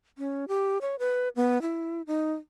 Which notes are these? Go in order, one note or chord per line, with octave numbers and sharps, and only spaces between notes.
C#4
G4
C#5
B4
B3
E4
D#4